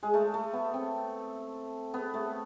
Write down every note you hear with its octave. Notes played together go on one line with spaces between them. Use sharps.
G#3
A3
A3
B3
C4
B3
A3